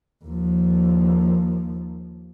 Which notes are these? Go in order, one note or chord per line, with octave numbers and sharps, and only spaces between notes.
D#2 F3